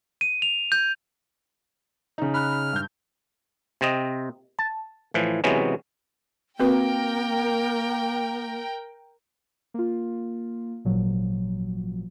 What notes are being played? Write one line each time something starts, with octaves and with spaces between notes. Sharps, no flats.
D#7
F7
G6
C#3 D#4
B5 F6 F#6
G2 G6
C3 C4 D#5
A5
A2 E3 F3
C3 E3 F#3 G#3 B3 C#4
A#3 C4 F#4 A#4 B4 G5
A#3 F4
G#1 A#2 F3 F#3